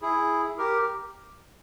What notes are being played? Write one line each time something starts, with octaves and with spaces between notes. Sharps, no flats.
E4 G#4
G4 A#4